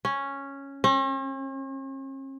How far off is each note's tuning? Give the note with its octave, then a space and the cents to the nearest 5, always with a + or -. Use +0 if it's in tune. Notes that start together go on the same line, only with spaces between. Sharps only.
C#4 -5
C#4 -45